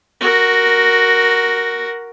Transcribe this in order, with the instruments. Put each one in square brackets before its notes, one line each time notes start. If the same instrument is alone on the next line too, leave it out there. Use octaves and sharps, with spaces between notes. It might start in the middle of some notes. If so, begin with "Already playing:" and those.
[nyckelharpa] F#4 A#4